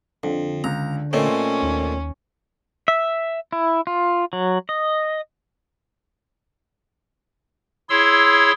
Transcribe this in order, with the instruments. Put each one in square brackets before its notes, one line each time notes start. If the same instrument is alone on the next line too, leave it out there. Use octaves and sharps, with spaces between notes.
[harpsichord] F2 [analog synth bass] D3
[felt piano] C#2 [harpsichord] A#5
[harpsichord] A#2 A3 C4 [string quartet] C#4 [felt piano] A4 C#5 D#5
[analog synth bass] D#2
[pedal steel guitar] E5
E4
F4
F#3
D#5
[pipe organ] E4 G#4 C#5 C6 E6